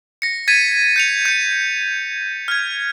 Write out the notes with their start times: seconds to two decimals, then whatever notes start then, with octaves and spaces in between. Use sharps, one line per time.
0.22 A#6 C#7
0.48 G#6 A6 B6 D#7
0.96 G6 C#7 F7
1.25 G6 C#7
2.48 F6 G#6